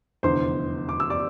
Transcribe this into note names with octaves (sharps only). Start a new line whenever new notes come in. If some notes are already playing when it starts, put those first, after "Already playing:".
F1 E2 D3 C5 C6
D6
E6
D5 D6